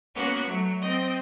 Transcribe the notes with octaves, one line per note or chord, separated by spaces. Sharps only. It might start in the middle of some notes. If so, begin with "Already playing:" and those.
A#3 B3 C#4 F#4
F#3 A3
C4 D#5